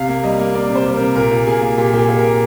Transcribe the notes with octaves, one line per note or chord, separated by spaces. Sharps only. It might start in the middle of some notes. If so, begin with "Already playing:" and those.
Already playing: C3 F5
A#3
G3 D#5
A#3
A#3 D5
C3
C5
G3
C3 A#4
A#2 A#4
A#2
A#3 G#4
A#3
A#2 G4
A#2 G4 G#4
A#2
A#4
A#2